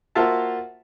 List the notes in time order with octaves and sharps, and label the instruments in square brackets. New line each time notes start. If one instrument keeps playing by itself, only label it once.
[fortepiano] A#3 F4 F#4 C5 E5 A5